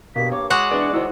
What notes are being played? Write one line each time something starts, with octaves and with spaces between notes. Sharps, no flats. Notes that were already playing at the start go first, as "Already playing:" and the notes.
G2 B2 A#3 B6
C#5 D6
G#3 F#4 F#5 D6
E2 D4 D5
D#3 F#3 E4 C5 D5